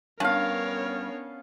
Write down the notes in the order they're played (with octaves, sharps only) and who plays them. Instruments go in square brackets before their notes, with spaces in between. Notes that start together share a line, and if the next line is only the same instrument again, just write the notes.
[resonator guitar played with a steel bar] G2 [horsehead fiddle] B3 C#4 [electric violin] A#4 C#5 [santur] F5 A5